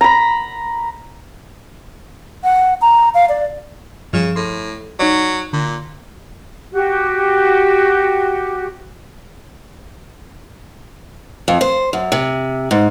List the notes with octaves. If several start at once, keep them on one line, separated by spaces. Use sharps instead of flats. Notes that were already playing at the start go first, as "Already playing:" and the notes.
A#5 B5
F#5
A#5
F5
D5
G2 C#3 F3 F6
A2 C6
F#3 D#4 C#5 D5
A#2 D3
F#4 G4
F2
C5
F#2
C3
G#2